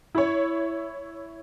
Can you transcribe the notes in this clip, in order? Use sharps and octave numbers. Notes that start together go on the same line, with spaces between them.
E4 C#5